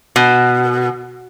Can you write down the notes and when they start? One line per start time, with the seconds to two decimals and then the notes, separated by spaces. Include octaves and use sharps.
0.16 B2